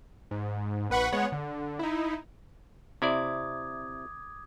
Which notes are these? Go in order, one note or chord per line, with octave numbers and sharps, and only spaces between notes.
G#2
A#1 B4 F#5 B5 C#6
G#3 B3 C#5 F#5
D3
D#4 E4
C3 E4 D5 D6 D#6 G#6